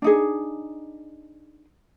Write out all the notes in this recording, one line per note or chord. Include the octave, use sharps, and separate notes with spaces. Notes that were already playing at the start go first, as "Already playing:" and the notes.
D4 D#4 G#4